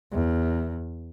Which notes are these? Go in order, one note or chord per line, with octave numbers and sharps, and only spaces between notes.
E2